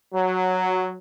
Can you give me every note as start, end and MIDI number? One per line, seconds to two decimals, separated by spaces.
0.14 0.98 54